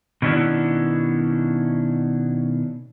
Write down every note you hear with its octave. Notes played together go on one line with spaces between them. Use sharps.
B2 D#3 C#4 D4 E4 F#4